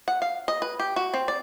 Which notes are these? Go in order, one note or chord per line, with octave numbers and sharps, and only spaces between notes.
F#5
F5
D#5
B4
G4
F#4
C4
D5